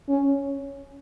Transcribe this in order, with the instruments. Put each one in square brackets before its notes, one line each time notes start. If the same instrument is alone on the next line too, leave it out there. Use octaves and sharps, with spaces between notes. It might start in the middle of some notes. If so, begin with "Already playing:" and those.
[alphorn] C#4